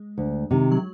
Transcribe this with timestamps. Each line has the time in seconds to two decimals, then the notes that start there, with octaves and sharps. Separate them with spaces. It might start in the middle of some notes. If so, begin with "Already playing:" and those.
Already playing: G#3
0.18 D2
0.51 C3 D#3
0.71 F#3